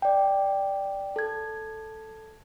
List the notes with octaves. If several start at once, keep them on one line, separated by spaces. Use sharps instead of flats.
D5 G5
A4 G#6